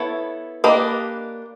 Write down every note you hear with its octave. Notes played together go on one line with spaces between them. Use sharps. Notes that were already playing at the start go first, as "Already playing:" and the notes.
Already playing: B3 E4 A4 C#5
A#3 D4 G4 B4 D#5